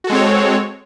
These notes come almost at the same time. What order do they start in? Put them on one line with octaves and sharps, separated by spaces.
F#4 A4 G#3 C4 C#5